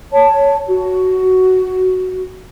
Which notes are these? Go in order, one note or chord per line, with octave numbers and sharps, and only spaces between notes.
C#5 A5
F#4